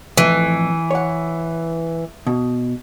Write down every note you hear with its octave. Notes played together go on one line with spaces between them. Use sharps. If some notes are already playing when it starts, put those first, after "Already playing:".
F2 A2 E3
C#5 F#5
B2